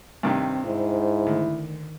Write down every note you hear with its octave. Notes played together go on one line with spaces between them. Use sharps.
G2 C3 D#3 C4
G#2 E4 C5
D2 D#3